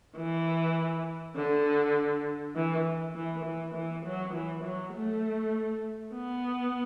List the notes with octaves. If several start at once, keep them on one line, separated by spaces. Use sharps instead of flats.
E3
D3
E3
E3
E3
E3
F#3
E3
F#3
A3
B3